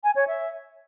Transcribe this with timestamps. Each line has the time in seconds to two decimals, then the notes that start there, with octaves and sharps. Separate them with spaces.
0.04 G#5
0.16 C#5
0.28 E5